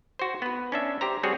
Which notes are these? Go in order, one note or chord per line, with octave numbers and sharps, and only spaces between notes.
F#4 C5
B3 B4
C#4 D4 E5
G4 C5 A#5
G3 C4 F#4 G#4 C#5 F#5